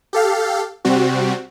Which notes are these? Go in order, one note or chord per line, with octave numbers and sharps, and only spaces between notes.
G4 A4 F5
C3 G3 C4 F#4